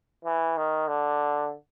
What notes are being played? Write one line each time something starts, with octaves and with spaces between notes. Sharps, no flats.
E3
D#3
D3